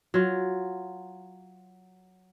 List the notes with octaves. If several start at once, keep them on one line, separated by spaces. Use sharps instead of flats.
F#3 F4